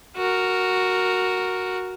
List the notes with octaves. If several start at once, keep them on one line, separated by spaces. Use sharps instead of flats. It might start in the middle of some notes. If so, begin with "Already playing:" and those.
F#4 A#4